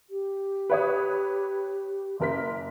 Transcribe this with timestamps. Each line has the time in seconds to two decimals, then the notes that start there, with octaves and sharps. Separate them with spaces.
0.10 G4
0.70 B4 C#5 D#6
2.20 F#1 A#4 C6 B6